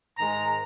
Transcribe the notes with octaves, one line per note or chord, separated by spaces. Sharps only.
G#2 D#3 G#3 A#5